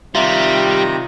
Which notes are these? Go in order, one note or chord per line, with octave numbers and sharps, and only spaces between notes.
C3 D#3 G3 F4 E5 A#5